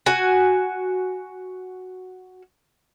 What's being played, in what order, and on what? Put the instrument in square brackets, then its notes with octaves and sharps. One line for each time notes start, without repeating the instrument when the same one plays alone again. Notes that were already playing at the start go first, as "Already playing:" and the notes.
[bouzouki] F#4 G#5